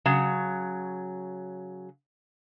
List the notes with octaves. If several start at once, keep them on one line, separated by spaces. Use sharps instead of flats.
C#3 F#3